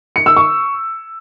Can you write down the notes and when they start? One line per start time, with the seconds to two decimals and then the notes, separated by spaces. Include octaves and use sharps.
0.16 C#7
0.26 E6
0.37 C#6